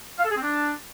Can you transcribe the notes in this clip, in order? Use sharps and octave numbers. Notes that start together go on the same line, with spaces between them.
F5
A4
G#4
C4
D4